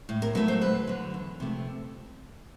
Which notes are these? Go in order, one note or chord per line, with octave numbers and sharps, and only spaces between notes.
A2
A#4
F#3 A3 B4
C5
D2 B4
D3 F#3
E2
C3 F3 A3